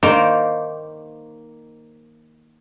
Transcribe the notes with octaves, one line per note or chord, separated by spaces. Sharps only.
D#3 A#3 C5 D5 A#5 C6